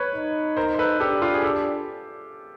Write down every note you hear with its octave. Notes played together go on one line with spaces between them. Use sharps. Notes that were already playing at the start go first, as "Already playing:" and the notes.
Already playing: B4 C#5
D#4
A#4 C5
C5
A4 B4
D4 G4 A4
F4 G4
G#4
G4 A4